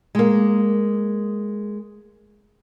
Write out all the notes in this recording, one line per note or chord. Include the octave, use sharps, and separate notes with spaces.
G#3 A#3